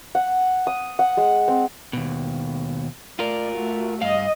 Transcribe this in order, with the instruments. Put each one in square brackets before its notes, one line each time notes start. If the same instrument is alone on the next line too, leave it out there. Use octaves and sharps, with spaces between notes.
[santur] F#5
D#6
F#5
G#3
C4
[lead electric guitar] D#2 B2
[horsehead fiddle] A3 D5 [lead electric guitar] F4 A#4
[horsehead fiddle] A3 F#4
[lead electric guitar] G2 F5 [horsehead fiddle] D#5